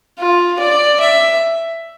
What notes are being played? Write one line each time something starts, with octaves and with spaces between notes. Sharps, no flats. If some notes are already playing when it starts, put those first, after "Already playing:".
F4
D5
E5